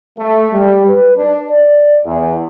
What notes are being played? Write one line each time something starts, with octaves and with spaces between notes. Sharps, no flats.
A3
G3
B4
D4
D5
E2